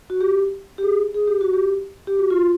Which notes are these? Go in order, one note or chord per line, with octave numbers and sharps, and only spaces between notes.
F#4
G4
G4
G#4
G#4
G4
F#4
G4
G4
F#4
F4